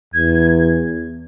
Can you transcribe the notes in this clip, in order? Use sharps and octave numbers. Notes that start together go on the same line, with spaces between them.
E2 G#6